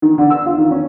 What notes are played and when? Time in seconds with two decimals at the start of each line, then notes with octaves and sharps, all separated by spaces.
0.02 D#3
0.18 D3
0.30 E6
0.46 F4
0.58 D#3
0.71 C#4